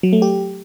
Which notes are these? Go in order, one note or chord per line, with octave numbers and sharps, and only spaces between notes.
F#3
A3
G4